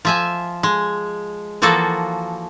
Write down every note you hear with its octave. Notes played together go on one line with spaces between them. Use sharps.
F3 E5 G#5
G#3
E3 F3 A#3 F#4 A4